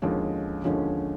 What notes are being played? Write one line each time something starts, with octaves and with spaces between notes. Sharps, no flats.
D#2 D3 F3 G#3 C#4
D#2 D3 F3 G#3 C#4